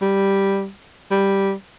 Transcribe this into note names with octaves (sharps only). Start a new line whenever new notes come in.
G3
G3